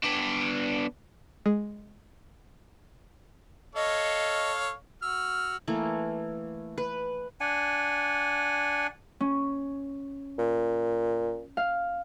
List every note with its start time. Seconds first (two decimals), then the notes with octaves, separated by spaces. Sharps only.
0.03 B3 D4
1.46 G#3
3.75 A4 C#5 D#5 F5
5.02 F#4 E6 F6
5.68 E3 A3 A#3
6.78 B4
7.40 D4 F#5 G#5
9.21 C#4
10.39 A#2
11.57 F5